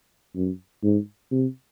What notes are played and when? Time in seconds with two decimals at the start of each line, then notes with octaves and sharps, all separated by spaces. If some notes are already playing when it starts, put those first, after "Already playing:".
0.35 F#2
0.83 G#2
1.31 C3